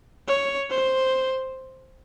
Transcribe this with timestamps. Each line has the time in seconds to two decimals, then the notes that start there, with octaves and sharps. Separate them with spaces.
0.28 C#5
0.71 C5